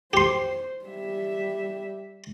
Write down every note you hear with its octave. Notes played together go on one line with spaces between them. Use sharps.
G4 C5 C6
G3 E5